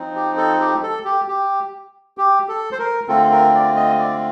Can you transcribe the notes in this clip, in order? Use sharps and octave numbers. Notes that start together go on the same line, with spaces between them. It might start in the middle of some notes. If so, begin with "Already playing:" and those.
Already playing: F3 C4 D#4
G4
A4
G4
A4
G4
G4
G4
A4
C5
A#4
D3 A3 C4 F4 A4
A#4
D5
D#5
D5